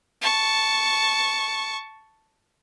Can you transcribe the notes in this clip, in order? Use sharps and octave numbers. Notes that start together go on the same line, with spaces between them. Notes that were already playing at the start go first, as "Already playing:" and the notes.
A5 C#6